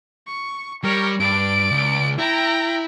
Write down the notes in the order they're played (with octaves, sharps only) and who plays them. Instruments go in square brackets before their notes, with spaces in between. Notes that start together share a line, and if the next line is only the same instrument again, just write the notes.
[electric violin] C#6
[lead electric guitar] G3 [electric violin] A#4 C#5
[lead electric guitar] G2 [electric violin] D5 D7
[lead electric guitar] C#2
[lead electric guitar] E4 [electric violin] G5 A#5